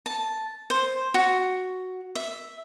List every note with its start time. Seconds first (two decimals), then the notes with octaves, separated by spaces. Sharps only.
0.06 A5
0.70 C5
1.14 F#4
2.15 E5